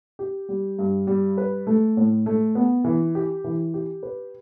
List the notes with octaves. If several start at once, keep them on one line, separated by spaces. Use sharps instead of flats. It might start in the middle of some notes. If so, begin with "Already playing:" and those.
G4
G3
G2
G3
B4
A3
A2
A3
B3
E3
G4
E3
G4
B4